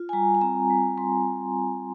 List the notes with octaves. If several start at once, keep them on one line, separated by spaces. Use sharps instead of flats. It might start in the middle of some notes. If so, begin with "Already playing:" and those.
Already playing: F4
G#5
G3 A#5
G#5
C4 A#5
G3
G3 C6